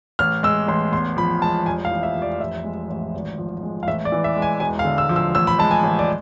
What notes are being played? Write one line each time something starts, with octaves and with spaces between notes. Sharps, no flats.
A1 F6
G#3 E6
A1 C6
E2 C6
F3 B5
G#3 A5
F1 G#5
F5
E3
E5
F1
D5
A1 E5
G#3
A1
G#1
F3
G#3
F5
A1 E5
D5
E3
E5
G#3
G#5
E1 G#5
F5
D3
E6
F3
E6
A1 E6
B5
G#3 A5
G#5
A1
D5